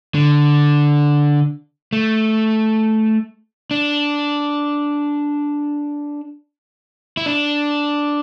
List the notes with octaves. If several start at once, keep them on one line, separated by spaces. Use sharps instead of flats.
D3
A3
D4
E4
D4